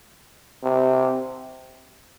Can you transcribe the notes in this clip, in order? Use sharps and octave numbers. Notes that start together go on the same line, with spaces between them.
C3